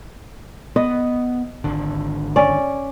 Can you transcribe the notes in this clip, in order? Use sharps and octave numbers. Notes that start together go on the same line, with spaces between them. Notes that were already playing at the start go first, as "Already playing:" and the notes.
B3 D#5
G#1 D3
C#4 D5